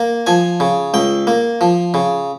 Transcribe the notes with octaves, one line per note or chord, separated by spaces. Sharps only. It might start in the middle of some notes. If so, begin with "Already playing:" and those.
Already playing: A#3
F3 G#5
C#3
C#2 G5
A#3
F3
C#3